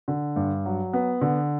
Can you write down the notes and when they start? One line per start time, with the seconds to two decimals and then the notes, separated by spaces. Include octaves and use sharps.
0.08 D3
0.36 G2
0.65 F#3
0.93 B3
1.21 D3